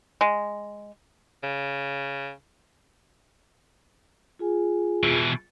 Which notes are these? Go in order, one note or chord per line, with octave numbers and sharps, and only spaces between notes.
G#3
C#3
F4 G#4 G#5
B2 E3